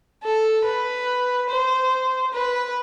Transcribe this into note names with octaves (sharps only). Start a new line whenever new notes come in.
A4
B4
C5
B4